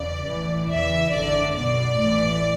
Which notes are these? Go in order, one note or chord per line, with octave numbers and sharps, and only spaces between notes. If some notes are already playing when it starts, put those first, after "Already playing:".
Already playing: E2 C#3 D5
A1 A2 E3
E2 C#3 E3 E5
G#1 F#2 D3 D5
B1 B2 D5
A1 A2 E3